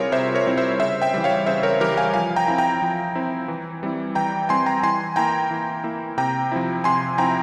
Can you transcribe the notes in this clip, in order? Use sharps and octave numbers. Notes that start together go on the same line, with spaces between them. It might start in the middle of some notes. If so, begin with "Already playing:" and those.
Already playing: C3 G3 C4 E4 F4 G#4 A#4 C#5
C3 C5 E5
A#4 C#5
G3 C4 E4
C5 E5
C#3 C5 E5
E5 G5
E3 G3
C#5 F5
C#3 C5 E5
A#4 C#5
E3 G3 G4 A#4
F5 G#5
F3 F5 G#5
G5 A#5
C4 E4
G5 A#5
F3
C4 E4
E3
G3 C4 E4
E3 G5 A#5
G3 C4 E4 G#5 C6
G5 A#5
E3 G#5 C6
A#3 E4 G5 A#5
E3
A#3 E4
C3 G5 A#5
F3 C4 E4
C3 G#5 C6
F3 C4 E4 G5 A#5